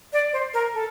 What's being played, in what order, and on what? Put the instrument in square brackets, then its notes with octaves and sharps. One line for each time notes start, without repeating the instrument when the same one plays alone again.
[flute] D5
C5
A#4
A4